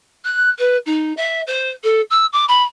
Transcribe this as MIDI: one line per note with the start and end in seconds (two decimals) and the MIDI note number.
0.24 0.49 90
0.58 0.76 71
0.86 1.13 63
1.17 1.41 76
1.47 1.69 72
1.83 2.01 69
2.10 2.26 88
2.32 2.45 86
2.48 2.62 83